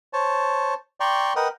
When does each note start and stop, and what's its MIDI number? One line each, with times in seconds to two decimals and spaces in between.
0.13 0.74 72
0.13 0.74 73
0.13 0.74 81
1.00 1.33 74
1.00 1.33 79
1.00 1.33 82
1.00 1.33 84
1.00 1.33 85
1.36 1.48 70
1.36 1.48 71
1.36 1.48 75
1.36 1.48 78
1.36 1.48 79